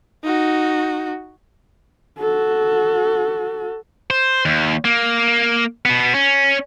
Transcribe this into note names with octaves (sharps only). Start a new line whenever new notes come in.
D#4 F#4
F#4 A4
C5
D#2
A#3
B2 B3
C#4